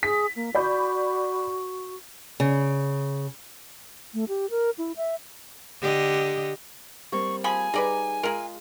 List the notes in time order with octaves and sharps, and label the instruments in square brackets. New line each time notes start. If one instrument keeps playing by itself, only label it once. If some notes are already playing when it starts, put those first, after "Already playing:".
[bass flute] G#4 [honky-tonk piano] B6
[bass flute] A#3
[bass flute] F#4 [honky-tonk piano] D5 B5 G6
[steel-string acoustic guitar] C#3
[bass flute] A3
G4
A#4
E4
E5
[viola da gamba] D3 G4 D#5
[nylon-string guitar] G3 A#3 C4 [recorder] C#6
[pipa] F3 G#4 B5 [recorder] G#5
[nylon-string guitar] G3 D#4 G#4 [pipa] B4 D5 A#5
[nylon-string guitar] G#3 F4 [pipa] G#4 A#4